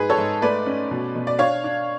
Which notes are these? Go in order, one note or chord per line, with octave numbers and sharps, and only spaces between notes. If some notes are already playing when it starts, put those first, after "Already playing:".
Already playing: G#2 G#4 B4
A4 C#5
G#2
A3 B4 D5
C#4
B2
B2
D5
D4 C#5 F5
D4